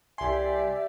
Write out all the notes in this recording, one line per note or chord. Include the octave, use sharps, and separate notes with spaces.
C2 G4 D5 E5 G#5 C6